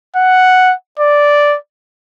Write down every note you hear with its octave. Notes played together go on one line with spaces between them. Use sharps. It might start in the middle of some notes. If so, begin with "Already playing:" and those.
F#5
D5